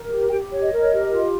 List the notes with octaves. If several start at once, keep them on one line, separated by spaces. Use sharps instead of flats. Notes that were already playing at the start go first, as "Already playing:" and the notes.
Already playing: A#4
G4
G4 G5
C#5
D#5
A#4
G4
F4